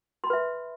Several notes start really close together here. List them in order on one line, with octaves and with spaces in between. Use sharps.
C6 B5 B4 E5